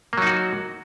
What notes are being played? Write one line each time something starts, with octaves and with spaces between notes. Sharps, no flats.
F#3 A#3 D#4 F#4